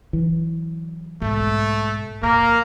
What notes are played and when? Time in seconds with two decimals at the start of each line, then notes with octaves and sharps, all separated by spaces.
0.13 E3 F#3
1.22 B1 G#2 A3
2.23 F2 A#2 A#3 A#4